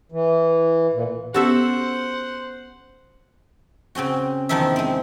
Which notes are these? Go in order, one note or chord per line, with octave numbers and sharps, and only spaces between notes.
E3
A#2
B3 C#4 F#4 G4 A4 C5 E5 F#5
C#3 C4 C#4 F#4
E2 C3 D#3 F3 D#4 E5
G#3 C4